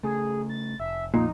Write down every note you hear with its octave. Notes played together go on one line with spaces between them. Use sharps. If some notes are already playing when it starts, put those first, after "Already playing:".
C#3 A3 G#4
A6
F1 E5
A#1 F2 A#2 D#4